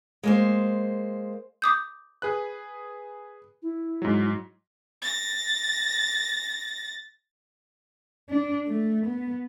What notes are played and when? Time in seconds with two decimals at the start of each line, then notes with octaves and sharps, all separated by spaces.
0.23 G#3 A#3 C5
1.62 D6 D#6 G6
2.22 G#4 B4 F#6
3.62 E4
4.02 G#2 F#3
5.02 A6 A#6
8.29 D4
8.67 A3
9.06 B3